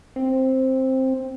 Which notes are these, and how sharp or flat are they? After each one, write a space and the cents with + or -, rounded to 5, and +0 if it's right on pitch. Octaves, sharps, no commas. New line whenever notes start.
C4 +5